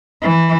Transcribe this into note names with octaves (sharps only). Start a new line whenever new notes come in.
E3